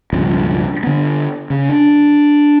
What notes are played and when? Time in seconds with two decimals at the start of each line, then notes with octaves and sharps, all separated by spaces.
0.13 C#2 G2 B2 F3
0.83 D3 B3
1.50 C#3
1.69 D4